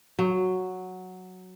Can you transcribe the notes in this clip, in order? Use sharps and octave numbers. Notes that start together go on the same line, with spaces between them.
F#3